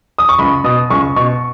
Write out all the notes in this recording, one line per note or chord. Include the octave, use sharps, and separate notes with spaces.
D#6
C#6
C#2 B5
B2 D#6
C#2 C#6
B2 C#6